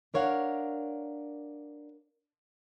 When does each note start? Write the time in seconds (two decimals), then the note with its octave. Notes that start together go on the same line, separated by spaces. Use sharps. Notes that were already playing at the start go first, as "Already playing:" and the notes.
0.14 D4 A#4 C#5 F5 F#5